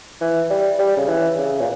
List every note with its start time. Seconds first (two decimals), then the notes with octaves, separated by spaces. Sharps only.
0.21 E3
0.50 G3
0.79 G3
0.97 C#3
1.08 E3
1.38 C#3
1.60 A#2